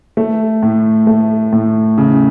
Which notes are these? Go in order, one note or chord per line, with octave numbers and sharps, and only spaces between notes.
A3
A2
A3
A2
C#3